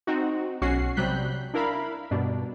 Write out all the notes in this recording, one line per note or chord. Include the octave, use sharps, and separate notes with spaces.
C4 D#4 F#4
B1 C#4 F#4 C7
C3 F#3 G3 F#6 G6 B6
D4 E4 A#4 F5 B5
G2 B2 D4